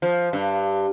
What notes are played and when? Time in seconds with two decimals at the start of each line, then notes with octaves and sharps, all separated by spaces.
0.02 F3
0.33 G2